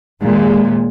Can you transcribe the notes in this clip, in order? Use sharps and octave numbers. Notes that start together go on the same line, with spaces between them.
D#2 A#2 G#3